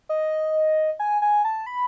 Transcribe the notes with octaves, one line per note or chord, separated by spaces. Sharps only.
D#5
G#5
G#5
A5
B5